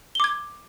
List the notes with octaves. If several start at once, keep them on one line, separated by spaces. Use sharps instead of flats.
D6 G#6 G7